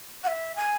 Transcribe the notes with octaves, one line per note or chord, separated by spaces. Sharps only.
F#5
E5
G#5